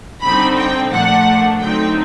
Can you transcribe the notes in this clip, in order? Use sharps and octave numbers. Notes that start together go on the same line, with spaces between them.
D3 G3 C4 D#4 B5
G5
A#2 F3 A3 D4 F#5
D3 F#3 A3 C4 D#4 G5